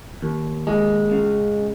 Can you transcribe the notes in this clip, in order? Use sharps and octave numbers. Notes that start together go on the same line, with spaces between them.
D#2
G#3
C#3